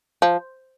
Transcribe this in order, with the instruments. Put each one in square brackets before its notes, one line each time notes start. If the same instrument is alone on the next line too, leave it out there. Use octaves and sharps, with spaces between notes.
[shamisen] F3